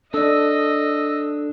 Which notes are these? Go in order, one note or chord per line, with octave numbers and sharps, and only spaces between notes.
D4 A4 D5 D#5 E6